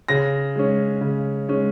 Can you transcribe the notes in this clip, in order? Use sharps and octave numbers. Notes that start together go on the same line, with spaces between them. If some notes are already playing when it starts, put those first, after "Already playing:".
C#3 A#6
G#3 C#4
C#3
G#3 C#4